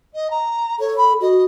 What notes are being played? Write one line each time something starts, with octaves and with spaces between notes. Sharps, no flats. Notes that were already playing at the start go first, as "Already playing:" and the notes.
D#5
A#5
A4 C#5
B5
F#4 D#5